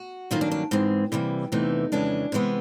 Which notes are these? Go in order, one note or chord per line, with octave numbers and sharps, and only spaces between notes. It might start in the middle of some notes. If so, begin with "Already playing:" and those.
Already playing: F#4
G2 D#3 F#3 A#3 C#4 F4
D4
D4
G#2 E3 G#3 C4
C3 E3 G3 A#3
E2 C3 E3 A3 D#4
F2 C#3 E3 G#3 C#4 D4
C3 E3 G#3 B3